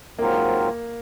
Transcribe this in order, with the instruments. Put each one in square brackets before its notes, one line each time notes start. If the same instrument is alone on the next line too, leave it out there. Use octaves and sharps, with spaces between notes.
[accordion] G#2 F#3 C4 F4 A#4 [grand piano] A#3